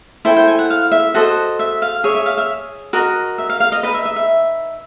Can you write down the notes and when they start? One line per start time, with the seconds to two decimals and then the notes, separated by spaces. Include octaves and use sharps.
0.25 E4 A4 C5 G5
0.37 G5
0.47 G#5
0.59 F#5
0.70 F5
0.92 E5
1.14 F#4 A4 C5 D#5
1.59 E5
1.82 F5
2.04 G#4 C#5 E5
2.15 E5
2.26 F5
2.38 E5
2.93 F#4 A#4 D#5
3.38 E5
3.49 F5
3.60 F5
3.72 D#5
3.83 D#4 F#4 B4 D#5
3.94 E5
4.05 E5
4.16 E5